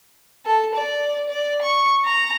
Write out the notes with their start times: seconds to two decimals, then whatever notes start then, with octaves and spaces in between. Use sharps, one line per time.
0.46 A4
0.75 D5
1.29 D5
1.62 C#6
2.06 A#5